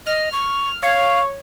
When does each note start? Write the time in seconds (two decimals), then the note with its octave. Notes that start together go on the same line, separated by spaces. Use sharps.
0.06 D#5 F6
0.32 C#6
0.83 C#5 F5